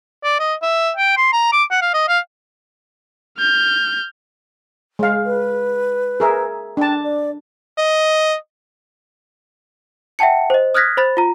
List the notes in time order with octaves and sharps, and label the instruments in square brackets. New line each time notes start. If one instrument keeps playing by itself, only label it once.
[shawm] D5
D#5
E5
G5
C6
A#5
D6
F#5
F5
D#5
F5
[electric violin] F6 G6
[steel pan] G#3 F5
[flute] B4
[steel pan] G#4 A#4 E5
[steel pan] D4 A5 [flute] G5
[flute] D5
[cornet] D#5
[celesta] E5 F#5 G5 A5 C#7
C5 D#5
D#6 F6 F#6 G#6 A#6 B6
C5 B5 A6
F4 A#5